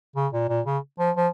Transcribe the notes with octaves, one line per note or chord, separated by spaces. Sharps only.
C#3
A#2
A#2
C#3
F3
F3